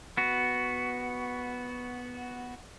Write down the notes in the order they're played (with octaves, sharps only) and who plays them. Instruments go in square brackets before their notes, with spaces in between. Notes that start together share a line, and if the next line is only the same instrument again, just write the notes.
[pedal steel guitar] B3 F#4